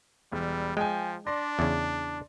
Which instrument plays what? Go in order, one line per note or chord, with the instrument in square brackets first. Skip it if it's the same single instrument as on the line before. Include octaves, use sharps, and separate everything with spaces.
[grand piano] E1 [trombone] G3
[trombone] F3 [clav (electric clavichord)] G#3 [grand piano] G5 G#5
[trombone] D4 [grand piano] D5 C6 A#6
[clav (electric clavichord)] E2 C#3